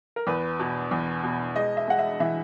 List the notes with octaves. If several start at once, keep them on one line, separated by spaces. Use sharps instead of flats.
A#4
E2 B4
B2
E2
B2
G#3 D#5
E5
G#3 F#5
E5
E3 E5